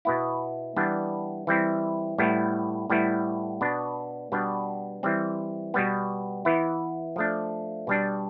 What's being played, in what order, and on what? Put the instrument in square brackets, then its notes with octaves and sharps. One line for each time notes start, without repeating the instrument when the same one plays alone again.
[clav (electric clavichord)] B2 B3 E4
E3 G3 B3 D4
E3 G3 C4 E4
A2 G3 B3 E4
A2 G3 B3 E4
B2 B3 D4
B2 G3 B3 D4
E3 G3 C4
B2 G3 B3
E3 B3 E4
F3 A3 D4
B2 G3 D4